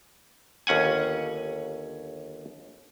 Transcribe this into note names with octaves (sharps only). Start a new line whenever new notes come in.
G1 D#2 C#4 F#5 G#5